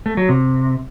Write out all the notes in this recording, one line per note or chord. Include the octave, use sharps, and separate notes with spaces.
A3
F#3
C3